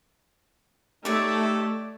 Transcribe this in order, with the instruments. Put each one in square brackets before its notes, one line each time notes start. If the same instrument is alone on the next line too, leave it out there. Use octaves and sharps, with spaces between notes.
[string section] A3 [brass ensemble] D#4 G4 A4 [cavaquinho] C#5 D5